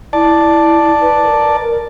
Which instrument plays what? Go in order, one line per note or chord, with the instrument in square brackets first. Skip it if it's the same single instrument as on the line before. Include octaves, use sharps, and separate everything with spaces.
[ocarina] E4 [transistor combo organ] D5 A5
[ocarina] B4
A#4